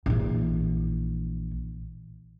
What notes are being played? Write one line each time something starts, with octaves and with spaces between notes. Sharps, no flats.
A#1 E3